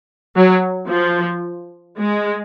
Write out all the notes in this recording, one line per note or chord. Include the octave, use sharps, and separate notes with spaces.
F#3
F3
G#3